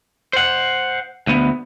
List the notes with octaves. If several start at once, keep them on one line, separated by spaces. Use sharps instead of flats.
C5 F#5
D2 B3